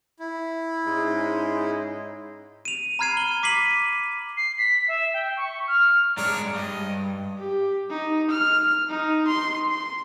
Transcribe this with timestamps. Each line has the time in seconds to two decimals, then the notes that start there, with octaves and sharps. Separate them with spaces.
0.19 E4
0.86 G#2 G#3 C#4
2.65 D#7 F7
2.99 A#5 B5 F6 G#6 C7 D#7
3.17 F#7 G7
3.43 D6 B6 C7 D#7 F#7
4.37 C7
4.58 B6
4.88 E5
5.14 G5
5.37 C#6
5.68 F6
6.17 G2 G#3 D4 C#5 A#5
6.55 G2 D#5
7.38 G4
7.89 D#4
8.30 F6
8.89 D#4
9.28 C6
9.70 C6